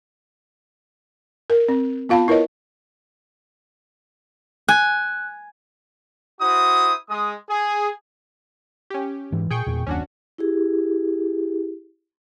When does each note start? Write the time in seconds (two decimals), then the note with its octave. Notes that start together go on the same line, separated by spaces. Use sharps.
1.50 A#4
1.69 C4
2.09 B3 F4 F5 A5 B5
2.28 E4 A#4 B4 C#5 D#5
4.69 G#5 F#6
6.39 E4 F#4 C5 D#6
7.08 G#3 D#6
7.48 G#4
8.90 C#4 G4
9.32 G#2 E3
9.50 A#2 G#4 G5 C#6
9.67 E1 E2 A#2
9.87 F#1 D#2 C#4 D4 F#4
10.38 E4 G4 G#4